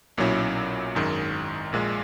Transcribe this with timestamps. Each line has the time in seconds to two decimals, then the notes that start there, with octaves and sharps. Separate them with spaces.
0.18 B1 A#2 F#3 C#4 E4
0.95 G#1 F#2 D#3 G#3
1.73 A#1 A#2 G#3